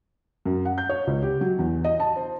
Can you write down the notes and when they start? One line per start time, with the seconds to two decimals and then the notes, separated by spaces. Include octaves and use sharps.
0.46 F#2
0.65 F#5
0.78 G6
0.89 C#5
1.07 C#2
1.22 G4
1.41 F#3
1.59 E2
1.84 D#5
2.00 A5
2.16 C5